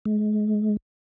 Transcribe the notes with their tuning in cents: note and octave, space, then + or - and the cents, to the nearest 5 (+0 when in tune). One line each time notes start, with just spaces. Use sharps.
G#3 +35